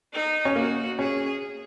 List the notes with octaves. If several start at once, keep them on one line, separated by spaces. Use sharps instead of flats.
D#4
C#4
A#3 F#4
C#4 G#4